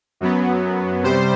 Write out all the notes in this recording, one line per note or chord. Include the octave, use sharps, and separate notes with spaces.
F#2 F#3 B3
C3 G3 C5